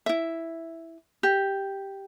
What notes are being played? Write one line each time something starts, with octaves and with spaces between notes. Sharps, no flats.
E4 E5
G4